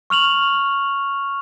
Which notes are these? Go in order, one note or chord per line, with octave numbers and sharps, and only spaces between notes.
C#6 F6 F7 F#7